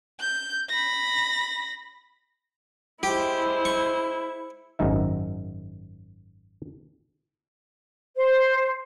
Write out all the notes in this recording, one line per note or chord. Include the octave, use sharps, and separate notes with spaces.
G6
B5 A#6
G#3 E4 G4 C5
C#6
G#1 F#2 D#4 E5
C5